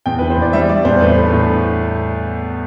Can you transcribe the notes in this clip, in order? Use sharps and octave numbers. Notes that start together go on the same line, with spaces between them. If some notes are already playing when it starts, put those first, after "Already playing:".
E2 G5
E3 B4
C5
E2 D5
G3 E5
G3 D5
E2 C5
A2 B4
A3
A2